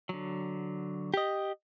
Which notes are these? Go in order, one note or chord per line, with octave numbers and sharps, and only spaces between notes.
D3 F#3
G4 D#5